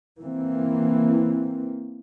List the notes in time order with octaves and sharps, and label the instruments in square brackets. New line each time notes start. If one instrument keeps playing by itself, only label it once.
[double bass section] E3 A#3 C4